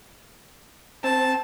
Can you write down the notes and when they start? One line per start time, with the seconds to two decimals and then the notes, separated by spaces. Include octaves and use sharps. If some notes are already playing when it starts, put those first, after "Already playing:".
1.04 C4 A5